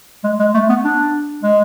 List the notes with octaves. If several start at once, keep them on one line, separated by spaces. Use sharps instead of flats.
G#3
G#3
A3
B3
D4
G#3